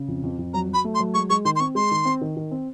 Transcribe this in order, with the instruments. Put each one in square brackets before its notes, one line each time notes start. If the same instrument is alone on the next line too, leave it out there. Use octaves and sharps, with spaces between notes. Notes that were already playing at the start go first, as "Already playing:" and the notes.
Already playing: [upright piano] C#3
F2
F2
F2
[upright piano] F#3 [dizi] A#5
[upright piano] F#3 [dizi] B5
[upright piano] A3
[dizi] C6
[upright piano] F#3
[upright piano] G#3 [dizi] C#6
[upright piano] G#3 [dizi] C#6
[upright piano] D#3 [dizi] C6
[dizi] C6
[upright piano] C4 [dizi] C#6
[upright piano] G#3 [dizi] C6
[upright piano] D#3
C4
D#3
D#3
C4